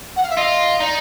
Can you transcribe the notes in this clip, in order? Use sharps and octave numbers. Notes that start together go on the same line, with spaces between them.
F#5
F5
E5
F4 D#5
D#4 D5